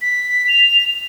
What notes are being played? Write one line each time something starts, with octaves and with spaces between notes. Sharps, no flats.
B6
F7